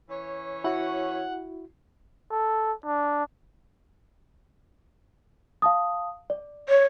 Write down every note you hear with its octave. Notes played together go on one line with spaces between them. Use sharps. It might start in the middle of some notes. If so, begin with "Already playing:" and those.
E3 C#4 C#5
E4 F#4 F#5
A4
D4
F5 A5 D#6
D5
C#5